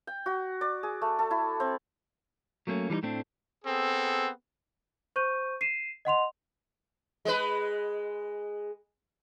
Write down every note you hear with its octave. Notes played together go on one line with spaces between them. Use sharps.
G5
F#4
D5
G#4
A3
A4
E4
C4
F#3 A3 A#3 C4 C#4
E3 G3 D4 D#4
A2 A3 C4 D4
B3 C4 G#4 A4
C5 C#6 G6 D#7
C7 D#7 E7
D#5 F#5 C6 F7
G#3 B4